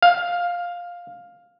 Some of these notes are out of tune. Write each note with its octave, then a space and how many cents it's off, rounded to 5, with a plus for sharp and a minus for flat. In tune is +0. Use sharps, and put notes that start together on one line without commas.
F5 +10